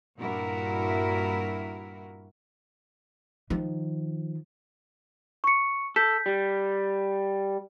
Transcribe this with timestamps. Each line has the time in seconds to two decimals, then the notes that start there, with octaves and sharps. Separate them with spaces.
0.19 G2 A#2 E4 F#4 A#4
3.50 D#3 F3
5.44 C#6 C#7
5.96 A4 G6 B6
6.26 G3